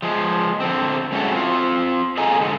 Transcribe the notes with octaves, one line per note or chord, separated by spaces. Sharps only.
F3 G#3
D3 C4
G#3 C#4 E4 F#4 A4
C4 F4
G#4 A4 D#5 F5 G#5 A#5
G#2 D3 G#3